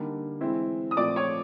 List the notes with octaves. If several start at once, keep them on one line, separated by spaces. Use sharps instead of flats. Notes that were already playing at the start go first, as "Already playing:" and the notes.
Already playing: D3 G3 A#3 D#4
E3 G#3 C4 E4
D#6
A#2 F3 A3 C4 F4 D5 D6
C#5 C#6